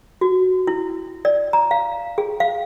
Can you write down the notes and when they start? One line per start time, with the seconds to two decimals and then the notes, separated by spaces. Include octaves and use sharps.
0.21 F#4
0.67 E4
1.25 D5
1.53 A#5
1.71 F5
2.18 G#4
2.40 F5